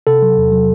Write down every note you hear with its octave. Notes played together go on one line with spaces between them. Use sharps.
C3 A4
F#3
E2
F#3